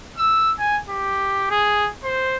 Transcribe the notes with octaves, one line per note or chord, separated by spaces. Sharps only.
E6
G#5
G4
G#4
C5